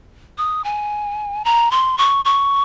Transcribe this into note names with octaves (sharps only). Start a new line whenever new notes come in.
D#6
G#5
A#5
C6
C#6
C#6